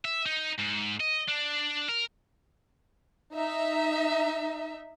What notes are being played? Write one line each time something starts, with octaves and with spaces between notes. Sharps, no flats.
E5
D#4
G#2
D#5
D4
A#4
D#4 E5